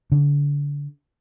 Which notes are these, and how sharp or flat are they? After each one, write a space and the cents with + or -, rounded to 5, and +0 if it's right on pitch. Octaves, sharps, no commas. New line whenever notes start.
D3 -30